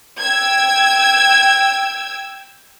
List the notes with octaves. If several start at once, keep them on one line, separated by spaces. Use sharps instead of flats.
G5 E6 G#6